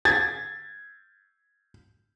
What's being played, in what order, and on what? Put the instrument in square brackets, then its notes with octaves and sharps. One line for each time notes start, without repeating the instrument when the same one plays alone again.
[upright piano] G#6 A6